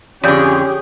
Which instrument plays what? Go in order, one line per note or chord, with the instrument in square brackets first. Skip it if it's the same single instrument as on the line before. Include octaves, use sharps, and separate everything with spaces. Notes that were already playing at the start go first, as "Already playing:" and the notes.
[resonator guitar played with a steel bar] F2 D3 [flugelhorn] C#4 [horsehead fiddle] G4 G#4 [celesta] D5 G6